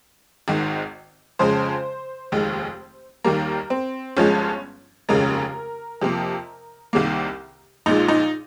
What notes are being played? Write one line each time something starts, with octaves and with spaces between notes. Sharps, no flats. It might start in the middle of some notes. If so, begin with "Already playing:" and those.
G#1 G#2 D#3
F2 C#3 G#3 C5
F1 D#2 D#3 G#3
D#2 D#3 G3 A#3 A#4
C4
G1 G2 F3 G#3 C#4
F1 D#2 C#3 G#3 A#4
F2 C3 F3 A#3
C2 C3 D#3 G3 A#3
A#1 A#2 G#3 D#4
D#4